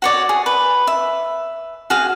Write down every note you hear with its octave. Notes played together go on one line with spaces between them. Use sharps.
F#4 C#5 D5
G#4
B4
E5
F#4 G#4 F5